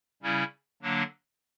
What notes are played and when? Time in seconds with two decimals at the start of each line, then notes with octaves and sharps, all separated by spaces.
0.23 C#3 G3 C#4 E4
0.82 D3 F#3 A#3 D4